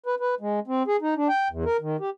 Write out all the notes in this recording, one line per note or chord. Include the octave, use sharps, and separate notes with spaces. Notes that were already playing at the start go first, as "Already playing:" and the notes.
B4
B4
G#3
C4
G#4
D#4
D4
G5
E2
A#4
D#3
G4